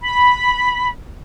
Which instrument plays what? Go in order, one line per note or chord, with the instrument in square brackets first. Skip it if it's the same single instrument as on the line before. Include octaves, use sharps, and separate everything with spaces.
[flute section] B5